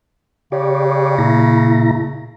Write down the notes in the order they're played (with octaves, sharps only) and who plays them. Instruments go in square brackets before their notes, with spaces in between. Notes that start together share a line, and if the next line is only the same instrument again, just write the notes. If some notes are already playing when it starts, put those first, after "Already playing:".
[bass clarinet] C#3 [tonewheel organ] G4 C#5 D5
[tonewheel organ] A#2 E4 A#5